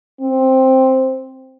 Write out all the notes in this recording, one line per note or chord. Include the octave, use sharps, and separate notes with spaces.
C4